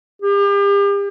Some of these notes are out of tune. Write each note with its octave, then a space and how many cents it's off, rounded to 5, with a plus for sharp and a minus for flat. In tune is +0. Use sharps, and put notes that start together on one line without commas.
G4 +40